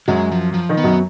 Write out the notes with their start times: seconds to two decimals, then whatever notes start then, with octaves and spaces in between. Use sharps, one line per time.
0.08 F#2 F#3 G#3
0.32 F3
0.54 F3
0.69 D#3 D#4
0.77 B3
0.84 F#2 F#3